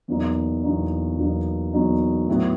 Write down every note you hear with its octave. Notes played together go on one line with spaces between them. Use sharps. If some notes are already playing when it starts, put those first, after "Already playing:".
E2 B2 F#3 A#3 D#4
E2 B2 F#3 A#3 D#4
E2 B2 F#3 A#3 D#4
E2 B2 F#3 A#3 D#4
A2 F#3 B3